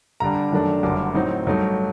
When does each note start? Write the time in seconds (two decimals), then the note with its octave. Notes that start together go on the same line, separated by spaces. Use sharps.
0.20 G2 D3 G3 D4 A#5
0.52 F#2 D#3 A3 D4
0.83 F#1 F#2 D3 G3 D6
1.14 A2 F#3 C4 D#4
1.47 G2 F#3 A3 D#4